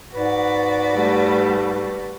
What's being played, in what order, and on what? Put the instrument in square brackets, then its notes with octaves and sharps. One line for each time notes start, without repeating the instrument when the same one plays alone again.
[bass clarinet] G#2 [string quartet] F#4 D5 [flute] B4
[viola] G3 A3